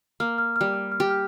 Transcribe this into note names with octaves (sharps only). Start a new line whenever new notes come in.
A#3 F6
F6
F6
G3
F6
F6
G4
F6